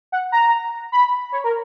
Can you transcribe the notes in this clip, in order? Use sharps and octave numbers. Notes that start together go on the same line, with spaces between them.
F#5
A#5
B5
C#5
A#4